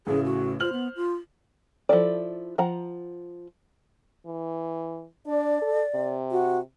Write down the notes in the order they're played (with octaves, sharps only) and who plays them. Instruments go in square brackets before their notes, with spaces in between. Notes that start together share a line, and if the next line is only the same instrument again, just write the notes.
[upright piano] A1 A2 C#3 [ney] G#4
[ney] F#4
[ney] F4 [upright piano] C5 F6 F#7
[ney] B3
F4
[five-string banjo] F3 E4 A4 D5
F3 F#5 A#5
[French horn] E3
[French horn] D4 [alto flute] D5
[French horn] A4
C3
[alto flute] F#4